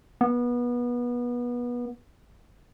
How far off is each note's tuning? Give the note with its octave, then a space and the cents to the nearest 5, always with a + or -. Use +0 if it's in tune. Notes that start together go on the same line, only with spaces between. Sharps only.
B3 -25